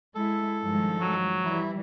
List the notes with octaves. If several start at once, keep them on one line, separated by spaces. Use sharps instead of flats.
G#3 E4 A4
G2 D#3 F3 G#3
F#3
E3 G3 E4